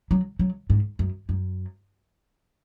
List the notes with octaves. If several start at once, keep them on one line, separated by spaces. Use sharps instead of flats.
F#3
F#3
G#2
F#2
F#2